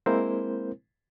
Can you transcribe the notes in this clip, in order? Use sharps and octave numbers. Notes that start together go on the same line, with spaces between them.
G#3 A#3 C4 E4 A#4 C5